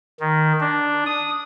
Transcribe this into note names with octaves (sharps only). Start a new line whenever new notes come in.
D#3
D4
D#6